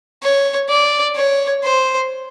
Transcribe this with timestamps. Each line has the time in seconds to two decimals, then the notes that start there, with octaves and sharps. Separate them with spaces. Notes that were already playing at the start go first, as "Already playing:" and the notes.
0.23 C#5
0.69 D5
1.16 C#5
1.63 C5